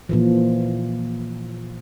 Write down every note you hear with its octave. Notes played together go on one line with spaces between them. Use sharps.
A#2 E3 F3